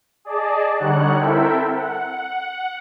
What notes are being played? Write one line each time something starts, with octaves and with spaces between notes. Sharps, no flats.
G#4 D5 D#5 A5
D3 G3 D#4 C#5 F#5 F#6
C4 E4 A4 A#4 E5 G5
F#5